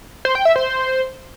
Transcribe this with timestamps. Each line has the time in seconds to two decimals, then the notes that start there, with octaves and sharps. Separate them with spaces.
0.25 C5
0.35 G5
0.45 E5
0.56 C5